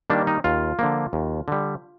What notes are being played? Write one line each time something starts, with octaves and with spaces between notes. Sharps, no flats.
D#3 G3 A#3 D4
D#4
D#2 F4
D3 F3 A#3
D#2
D3 G3